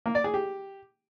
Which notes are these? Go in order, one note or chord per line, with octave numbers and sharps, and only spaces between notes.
A#3
D5
G#4
G4